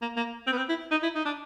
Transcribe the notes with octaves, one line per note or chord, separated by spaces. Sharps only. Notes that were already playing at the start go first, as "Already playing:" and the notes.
A#3
A#3
C4
B3
C4
E4
D#4
E4
D#4
D4